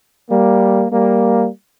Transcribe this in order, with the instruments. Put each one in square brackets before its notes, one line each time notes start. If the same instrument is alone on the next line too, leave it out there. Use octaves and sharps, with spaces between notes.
[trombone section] G3 A#3
G3 A#3